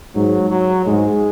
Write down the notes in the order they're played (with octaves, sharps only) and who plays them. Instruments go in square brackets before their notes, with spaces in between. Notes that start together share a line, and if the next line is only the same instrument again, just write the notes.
[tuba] G#2 [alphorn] F#3
[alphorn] F#3
[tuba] G#2 [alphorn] G#3